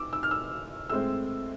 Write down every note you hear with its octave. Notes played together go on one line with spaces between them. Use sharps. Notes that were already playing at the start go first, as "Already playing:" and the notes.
Already playing: D6 E6
E6
F6
E6
A2 G#3 C4 E6